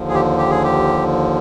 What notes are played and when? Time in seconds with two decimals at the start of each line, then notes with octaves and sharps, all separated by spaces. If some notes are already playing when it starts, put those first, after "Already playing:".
Already playing: D#2 D3 F3
0.09 G#4
0.14 G4
0.38 G4
0.50 G#4
0.64 G4